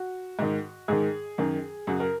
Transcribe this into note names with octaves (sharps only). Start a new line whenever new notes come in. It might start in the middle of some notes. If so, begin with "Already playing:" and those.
Already playing: F#4
G#2 D#3
G#2 D#3 G#4
F#2 D#3
F#2 C#3 F#4
A#4